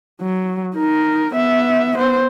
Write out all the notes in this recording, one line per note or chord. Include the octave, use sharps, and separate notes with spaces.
F#3
D#4 A#4
B3 E5
B3 C5